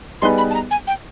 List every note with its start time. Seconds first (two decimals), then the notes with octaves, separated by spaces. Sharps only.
0.22 G3 B3 D#4 G#4 B4 C6
0.38 B5
0.50 A5
0.54 A#5
0.71 G#5
0.87 G5